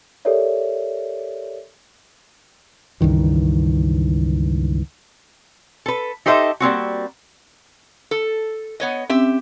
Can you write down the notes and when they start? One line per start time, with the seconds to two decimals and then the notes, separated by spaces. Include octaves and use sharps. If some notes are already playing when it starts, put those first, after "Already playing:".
0.25 G4 A4 A#4 C#5 D5 E5
3.01 C#2 G2 D#3 E3
5.86 A4 B4
6.26 D#4 G4 A4 C5 D#5 E5
6.60 G3 A#3 C4 F#4
8.11 A4
8.80 B3 C#5 D#5
9.10 C4 C#4 G4 E5